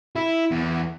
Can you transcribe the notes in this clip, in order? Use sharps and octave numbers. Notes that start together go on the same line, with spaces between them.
E4
E2